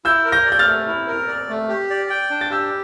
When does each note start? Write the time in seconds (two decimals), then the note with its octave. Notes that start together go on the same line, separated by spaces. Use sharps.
0.05 E4 E6 G6
0.25 A#4
0.32 G6 A#6
0.46 D5
0.52 G6
0.59 F6 A6
0.67 A3
0.87 E4
1.07 A#4
1.28 D5
1.49 A3
1.69 G4
1.90 D5
2.10 G5
2.31 D4
2.41 A6
2.51 G4 E6 G6